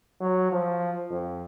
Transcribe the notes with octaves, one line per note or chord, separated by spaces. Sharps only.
F#3
F3
F2